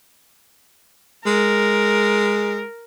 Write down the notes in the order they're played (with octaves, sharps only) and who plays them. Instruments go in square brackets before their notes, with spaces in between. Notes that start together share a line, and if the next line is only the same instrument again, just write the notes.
[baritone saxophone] G#3 [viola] A#4